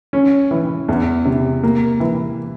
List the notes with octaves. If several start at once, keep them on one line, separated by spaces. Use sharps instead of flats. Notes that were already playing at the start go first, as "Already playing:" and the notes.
C#4
E3
E2
C3
A#3
E3